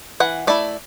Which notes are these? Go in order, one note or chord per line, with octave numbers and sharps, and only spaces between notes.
E3 F#5
A3 E4 D5